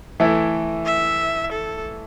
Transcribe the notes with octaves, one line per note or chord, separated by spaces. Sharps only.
E3 A3 E4
E5
A4